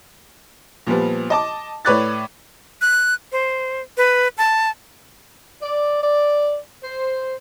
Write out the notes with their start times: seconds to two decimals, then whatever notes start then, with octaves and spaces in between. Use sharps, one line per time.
0.87 A#2 F3 G3 B3
1.30 D#5 A5 D6
1.85 A2 B4 C#5 D5 F#6 A6
2.81 F#6
3.32 C5
3.97 B4
4.38 A5
5.62 D5
6.01 D5
6.83 C5